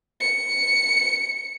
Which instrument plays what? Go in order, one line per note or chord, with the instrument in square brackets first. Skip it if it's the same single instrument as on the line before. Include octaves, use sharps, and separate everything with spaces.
[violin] C#7